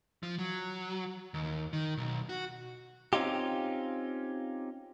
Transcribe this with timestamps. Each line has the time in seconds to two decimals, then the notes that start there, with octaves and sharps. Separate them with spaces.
0.23 F3
0.39 F#3
1.34 D#2
1.73 D#3
1.97 B1
2.29 F#4
3.13 C4 C#4 D#4 F4 G4